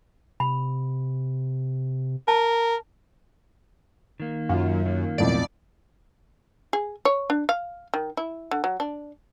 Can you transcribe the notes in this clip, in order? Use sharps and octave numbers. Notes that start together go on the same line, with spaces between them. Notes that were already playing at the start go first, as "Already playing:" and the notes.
C3 B5
A#4 A5
D#3 A#3
F#2 F4 F5
D#3 A#3
B1 F2 A2 D5
G#4
C#5
D4
F5
D#3
E4
D3
F#3
D4